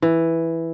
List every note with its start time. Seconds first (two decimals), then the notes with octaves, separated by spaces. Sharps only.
0.02 E3